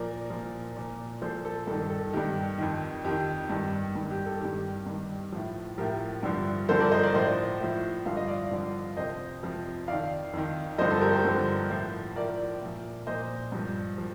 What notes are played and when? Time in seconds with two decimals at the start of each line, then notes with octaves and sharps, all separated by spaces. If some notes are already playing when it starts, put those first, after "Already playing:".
Already playing: A#2 F3 A#4 D5
0.30 A#2 F3
0.76 A#2 F3
1.22 A#2 F3 A4 C5
1.45 A4
1.67 G2 D#3 A4
1.90 A4
2.13 G2 D#3 G4
2.58 F2 D#3
3.04 F2 D#3 G4
3.50 G2 D#3
3.95 G2 D#3
4.11 G4
4.26 A4
4.41 G2 D#3 G4
4.86 G2 D#3
5.32 A2 F3
5.78 A2 F3 G4 A#4
6.23 G2 D3 F3
6.69 G2 D3 F3 A4 C5
6.80 A#4 D5
6.91 C5 D#5
7.03 A#4 D5
7.14 A2 F3 C5 D#5
7.60 A2 F3
8.06 G2 D3 F3 F5
8.17 D#5
8.27 D5 F5
8.51 G2 D3 F3
8.96 F2 C3 F3 C5 D#5
9.43 F2 C3 F3
9.88 F2 D#3 D5 F5
10.33 F2 D#3
10.78 G2 D3 F3 C5 D#5
10.91 A4
11.01 G4 A#4
11.13 A4 C5
11.25 G2 D3 F3
11.70 A2 F3
12.16 A2 F3 A#4 D5
12.61 A#2 F3
13.07 A#2 F3 C5 D#5
13.52 G2 F3
13.98 F3